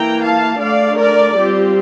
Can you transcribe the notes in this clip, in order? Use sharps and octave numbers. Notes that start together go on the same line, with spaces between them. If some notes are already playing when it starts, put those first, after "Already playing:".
Already playing: E3 A#3 E4 G5 A#5
F5 A5
D3 A3 D4 D5 F5
A#4 D5
G3 C4 F4 G4